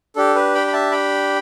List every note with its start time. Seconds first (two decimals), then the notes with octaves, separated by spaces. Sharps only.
0.16 D4 G4 A4
0.35 B4
0.54 G5 B5
0.67 B5
0.73 E5 A5
0.92 G5 B5